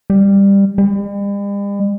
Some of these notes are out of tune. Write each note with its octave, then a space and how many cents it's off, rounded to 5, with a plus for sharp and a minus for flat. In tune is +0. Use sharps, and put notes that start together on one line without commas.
G3 +15
G3 +45